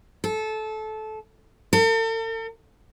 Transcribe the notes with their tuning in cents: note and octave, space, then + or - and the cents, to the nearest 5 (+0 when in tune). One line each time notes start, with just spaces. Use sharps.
A4 -20
A4 +45